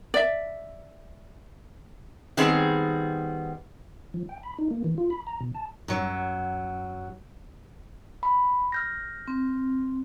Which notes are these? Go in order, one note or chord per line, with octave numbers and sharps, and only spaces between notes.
D5 E5
D#3 G3 B3 C4 G#4
F3
G5
B5
D#4
A#3
E3
F4
B5
A#5
B2
A5
F#2 F#3
B5
F6 G6 A#6
C4